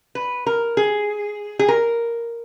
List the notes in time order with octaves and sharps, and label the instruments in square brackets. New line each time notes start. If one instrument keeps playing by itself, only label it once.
[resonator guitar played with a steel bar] B4
A#4
G#4
G#4
A#4